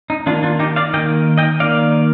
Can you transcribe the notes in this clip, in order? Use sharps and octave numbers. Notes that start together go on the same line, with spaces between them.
D#4
D#3 A#3 D4 F4
D4 F4
D#4 G4
D5 F5
D#3 A#3 D#5 G5
D#5 G5
D#3 A#3 D5 F5